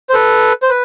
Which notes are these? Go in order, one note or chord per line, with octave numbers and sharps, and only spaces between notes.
C5
A4 B4
C5
B4